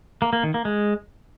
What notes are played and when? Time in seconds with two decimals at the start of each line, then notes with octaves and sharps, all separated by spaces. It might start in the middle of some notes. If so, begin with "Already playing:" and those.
0.22 A#3
0.33 A#3
0.43 D#3
0.54 A#3
0.65 G#3